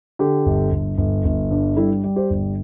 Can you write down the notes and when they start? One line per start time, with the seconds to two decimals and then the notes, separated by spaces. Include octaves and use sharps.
0.19 D3 G4
0.46 G1
0.72 G1
0.98 G1
1.25 G1
1.51 G2
1.76 G3 E4 A4
2.04 G3
2.16 G4 C5
2.30 G1